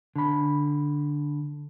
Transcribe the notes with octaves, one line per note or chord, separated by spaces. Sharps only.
D3 B5